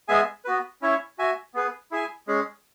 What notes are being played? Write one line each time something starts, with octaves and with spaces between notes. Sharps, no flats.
G#3 B3 G#4 E5 G#5
B3 F#4 B4
C#4 E4 C#5 E5
F#4 E5 G#5
B3 G#4 B4
E4 G#4 E5 G#5
G#3 C#4 G#4